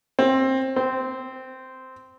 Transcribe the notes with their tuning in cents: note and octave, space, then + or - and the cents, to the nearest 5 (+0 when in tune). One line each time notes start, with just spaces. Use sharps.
C4 +20
C4 -10